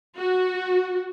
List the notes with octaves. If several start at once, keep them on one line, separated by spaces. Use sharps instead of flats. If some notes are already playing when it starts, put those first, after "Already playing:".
F#4